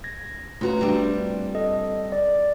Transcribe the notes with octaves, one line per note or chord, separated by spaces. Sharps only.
G#6 A#6
C#3 A3 F4 F#4 B4 A#5
G3 C4 D4
A4 D#5
D5